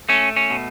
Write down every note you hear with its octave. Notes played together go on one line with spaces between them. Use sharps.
A3 C#4
C#4
B2